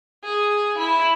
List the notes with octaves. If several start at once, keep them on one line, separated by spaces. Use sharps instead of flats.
G#4
E4